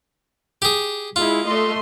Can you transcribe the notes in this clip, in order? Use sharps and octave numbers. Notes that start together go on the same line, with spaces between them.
G4 G#4
G#3 E4 F4
A3 D#5 C6